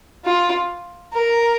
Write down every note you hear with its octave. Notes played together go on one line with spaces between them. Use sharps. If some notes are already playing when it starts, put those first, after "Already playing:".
F4
A#4